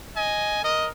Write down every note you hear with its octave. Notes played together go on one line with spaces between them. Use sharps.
D#5 G#5
A#4 D#5